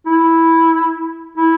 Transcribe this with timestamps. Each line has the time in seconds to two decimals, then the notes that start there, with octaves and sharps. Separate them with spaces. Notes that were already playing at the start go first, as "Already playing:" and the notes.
0.06 E4
1.37 E4